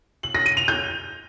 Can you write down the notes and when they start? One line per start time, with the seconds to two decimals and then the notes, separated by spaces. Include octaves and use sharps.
0.23 F#7
0.35 A#6
0.46 D#7
0.57 F7
0.68 G6